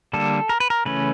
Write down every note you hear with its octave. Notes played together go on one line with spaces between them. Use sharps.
D3 G3 A#3 A4
A#4
B4
A#4
C#3 E3 A3 C#4 B4